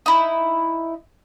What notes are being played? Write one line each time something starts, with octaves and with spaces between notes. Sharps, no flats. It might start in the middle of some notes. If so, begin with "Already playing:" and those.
D#4 E4